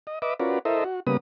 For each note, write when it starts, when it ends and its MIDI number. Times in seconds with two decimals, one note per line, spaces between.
0.07 0.19 75
0.22 0.34 71
0.22 0.34 75
0.22 0.34 76
0.22 0.34 86
0.40 0.59 61
0.40 0.59 65
0.40 0.59 66
0.40 0.59 70
0.40 0.59 71
0.40 0.59 74
0.65 0.84 64
0.65 0.84 69
0.65 0.84 70
0.65 0.84 72
0.65 0.84 75
0.65 0.84 76
0.84 1.00 66
1.07 1.17 49
1.07 1.17 55
1.07 1.17 58
1.07 1.17 59
1.07 1.17 71
1.07 1.17 87